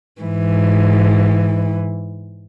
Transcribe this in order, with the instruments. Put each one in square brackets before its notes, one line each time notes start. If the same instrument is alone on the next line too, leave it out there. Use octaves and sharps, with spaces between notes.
[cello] G#2 E3